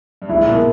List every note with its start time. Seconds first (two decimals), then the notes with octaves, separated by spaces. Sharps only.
0.22 G2
0.29 G#2 E4
0.42 A#2
0.47 G#2 B2 A#3